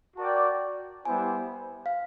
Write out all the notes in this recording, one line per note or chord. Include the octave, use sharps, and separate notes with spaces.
F#4 A#4 D5 G5 A5
G3 B3 E4 G4 C5 G#5
F5